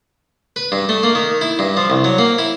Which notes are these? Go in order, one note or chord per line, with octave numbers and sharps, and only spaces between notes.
B4
G2
A3
A#3
D#3
E4
G2
F3
C2
F#3
A#3
E4